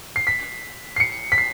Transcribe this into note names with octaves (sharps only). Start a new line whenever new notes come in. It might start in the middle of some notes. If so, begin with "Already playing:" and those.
C7
B6
C7
C#7
B6
C7